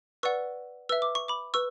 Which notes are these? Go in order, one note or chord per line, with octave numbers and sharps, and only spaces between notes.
B4 D5 F#5 C#6 E6
B4 E5 E6
D6
C#6
B5 D6
B4 C#6 E6